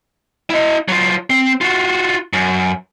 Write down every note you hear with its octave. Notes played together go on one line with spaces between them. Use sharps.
E4 D#5
F#3 F4
C4
F4 F#4
F#2